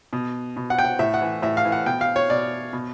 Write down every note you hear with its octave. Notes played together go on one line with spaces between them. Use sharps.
B2
B2
F#5
G5
F#5
A2 E5
F#5
E3
A2 E5
F5
E3
F#5
B2 G5
F5
C#5
B2 D5
B2